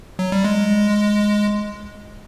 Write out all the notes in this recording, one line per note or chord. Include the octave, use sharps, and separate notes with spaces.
F#3
G3
G#3